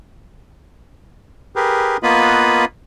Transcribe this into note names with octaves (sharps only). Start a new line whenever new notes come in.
G4 G#4 A#4 B4
A#3 B3 F4 B4 D#5 B5